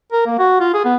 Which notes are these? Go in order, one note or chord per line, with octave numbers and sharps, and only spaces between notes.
A#4
A#3
F#4
F4
G#4
B3